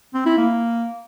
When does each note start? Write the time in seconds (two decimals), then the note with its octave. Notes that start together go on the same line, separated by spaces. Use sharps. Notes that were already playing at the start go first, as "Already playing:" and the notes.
0.14 C4
0.26 E4
0.38 A#3